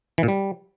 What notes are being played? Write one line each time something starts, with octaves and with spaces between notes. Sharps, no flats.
E3
A#2
G3